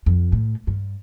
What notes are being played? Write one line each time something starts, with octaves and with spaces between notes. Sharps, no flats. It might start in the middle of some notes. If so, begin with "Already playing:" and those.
F2
A2
G2